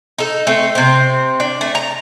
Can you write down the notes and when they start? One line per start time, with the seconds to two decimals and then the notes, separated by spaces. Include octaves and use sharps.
0.18 D#4 A4
0.47 A3 C4
0.75 C3 C4
1.40 D4
1.61 A3
1.75 A#5